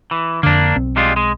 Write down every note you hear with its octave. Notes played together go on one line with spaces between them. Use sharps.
E3
F2 D3 A#3 D4
B1 C4
G3 G#3 F4
G#3